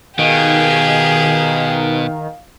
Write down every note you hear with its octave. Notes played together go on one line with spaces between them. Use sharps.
B2 D#3 G4 G#4 F5